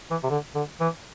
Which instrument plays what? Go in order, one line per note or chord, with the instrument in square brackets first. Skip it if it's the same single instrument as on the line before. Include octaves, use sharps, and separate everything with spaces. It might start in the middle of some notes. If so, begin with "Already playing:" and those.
[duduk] E3
C3
D3
D3
E3